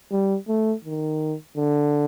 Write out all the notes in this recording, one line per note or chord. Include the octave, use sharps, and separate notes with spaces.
G3
A3
D#3
D3